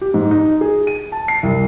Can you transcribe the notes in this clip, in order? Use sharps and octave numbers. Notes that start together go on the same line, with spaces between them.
G4
G#2
D#4
G#4
D#7
A5
C7
C2